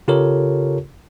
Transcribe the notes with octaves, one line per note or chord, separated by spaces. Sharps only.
C#3 F4 G4 A4 A#4 C#5